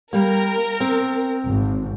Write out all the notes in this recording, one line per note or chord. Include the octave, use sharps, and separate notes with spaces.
G3 A#3 A#4
C4
G#1